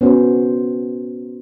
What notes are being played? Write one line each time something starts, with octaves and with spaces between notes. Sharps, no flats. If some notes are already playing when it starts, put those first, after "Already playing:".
B3 C#4 F#4 C5